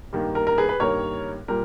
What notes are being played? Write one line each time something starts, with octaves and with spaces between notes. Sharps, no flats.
G2 D#3 A#3
A#4
A#4
G#4 B4
B4
G2 D#3 A#3 A#4 C#5
A#2 G3 A#3 A#4